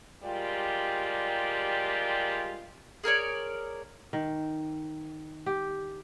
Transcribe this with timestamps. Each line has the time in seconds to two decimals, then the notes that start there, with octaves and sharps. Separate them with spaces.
0.23 G3 G#3 F4 G4 A#4 D5
3.04 G#4 A#4 C#5 D5
4.13 D#3
5.46 G4